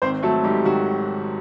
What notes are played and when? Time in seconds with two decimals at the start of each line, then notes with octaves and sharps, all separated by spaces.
0.02 G#1 C4 C5
0.22 F#3 A3 A4
0.44 G#2 G3 G4
0.65 D#3 F#3 F#4